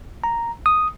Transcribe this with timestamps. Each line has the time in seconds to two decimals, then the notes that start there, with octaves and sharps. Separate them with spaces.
0.24 A#5
0.66 D#6